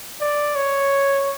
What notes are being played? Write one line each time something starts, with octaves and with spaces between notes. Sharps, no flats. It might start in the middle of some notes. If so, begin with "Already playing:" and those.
D5
C#5